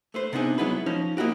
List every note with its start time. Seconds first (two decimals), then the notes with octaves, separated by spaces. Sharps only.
0.14 A3 B4 C5
0.33 C3 B3 D4 D#4 G#4
0.58 F#3 G#3 B3 E4 B4
0.86 F3 C#4 D#4
1.17 A#3 D#4 E4 F#4 G4